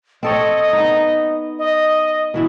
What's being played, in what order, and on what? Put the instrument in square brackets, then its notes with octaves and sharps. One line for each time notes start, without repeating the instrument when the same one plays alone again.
[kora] C4 A4 C#5 [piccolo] D#5
[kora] B3 D#4
[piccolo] D#5
[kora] B2 E3 E4